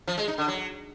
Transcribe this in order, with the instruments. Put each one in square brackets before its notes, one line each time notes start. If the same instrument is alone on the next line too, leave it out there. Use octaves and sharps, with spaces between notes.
[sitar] F3
G#3
D#4
D3
F#3